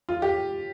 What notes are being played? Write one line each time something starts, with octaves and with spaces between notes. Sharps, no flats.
F4
G4